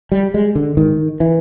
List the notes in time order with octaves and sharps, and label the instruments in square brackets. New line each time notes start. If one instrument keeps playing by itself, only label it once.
[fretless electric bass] G3
G#3
D3
G#2 D#3
E3